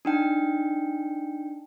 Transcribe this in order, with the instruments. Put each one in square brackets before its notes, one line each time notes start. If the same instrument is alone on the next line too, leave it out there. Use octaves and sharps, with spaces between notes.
[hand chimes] D4 D#4 G5